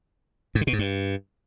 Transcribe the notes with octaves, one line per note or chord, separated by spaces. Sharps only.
G#2
D3
B2
G#2
G2